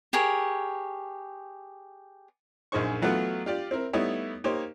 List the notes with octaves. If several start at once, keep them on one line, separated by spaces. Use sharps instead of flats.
G4 G#4 A#4 C#5
A#1 F#2 D#4 G#4 C5 C#6
E3 F#3 A3 B3 F4 F#4
F4 G4 D5
C4 E4 A#4
G3 A3 B3 D#4 E4 C#5
A#3 D#4 G4 C5 C#5